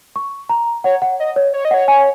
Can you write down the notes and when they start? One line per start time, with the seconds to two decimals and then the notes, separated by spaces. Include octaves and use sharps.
0.16 C#6
0.50 A#5
0.84 C#5 F#5
1.02 F#5
1.20 D#5
1.36 C#5
1.53 C#5
1.65 D#5
1.71 C#5 F#5
1.88 G#5